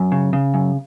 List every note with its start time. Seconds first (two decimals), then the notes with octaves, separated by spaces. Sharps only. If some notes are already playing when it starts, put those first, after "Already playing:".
Already playing: F#2
0.12 C#3
0.33 C#3
0.54 F#2